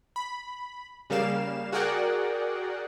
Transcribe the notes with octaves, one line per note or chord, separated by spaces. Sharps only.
B5
C#3 G3 A#3 F5 E7
F#4 G#4 A#4 D5 F#5 G5